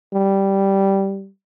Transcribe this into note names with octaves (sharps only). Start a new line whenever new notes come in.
G3